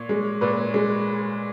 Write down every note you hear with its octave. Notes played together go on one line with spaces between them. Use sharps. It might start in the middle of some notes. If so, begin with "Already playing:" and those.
Already playing: A#2 C#5
G#3
A#2 B4
G#3